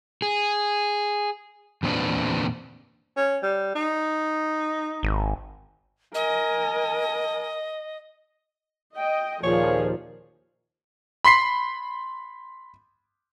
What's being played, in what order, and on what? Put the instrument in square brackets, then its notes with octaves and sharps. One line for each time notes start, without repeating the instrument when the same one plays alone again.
[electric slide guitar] G#4
E2 A#2 C4 D4 B4
[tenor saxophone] C#4
G3
D#4
[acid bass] G#1
[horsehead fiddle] A#4 G#5 [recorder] D#5
[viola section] D#5 [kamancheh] G5
[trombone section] D#2 A#2 [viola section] F3 [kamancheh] G#4 [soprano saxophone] C#5
[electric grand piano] B5 C6 B6 C7